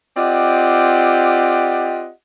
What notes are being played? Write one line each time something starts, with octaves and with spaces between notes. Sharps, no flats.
C4 F4 G4 D5 D#5 F#5